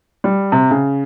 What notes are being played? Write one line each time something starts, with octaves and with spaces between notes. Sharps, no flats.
G3
C3
C#3